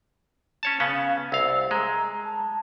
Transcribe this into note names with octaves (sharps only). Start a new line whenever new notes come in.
C#4 C#5 A5
C#3 B3 C#4 F5
C2 F5 E6
G#3 A#5
A5